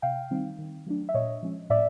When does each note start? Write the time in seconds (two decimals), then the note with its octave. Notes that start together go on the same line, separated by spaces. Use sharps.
0.02 C3 F5 G5
0.31 D#3 G3 C4 D#4
0.59 D#3
0.87 F#3 A3 D4
1.09 E5
1.14 A#2 C#5 D#5
1.42 F3 G#3 C#4
1.70 A2 D5 E5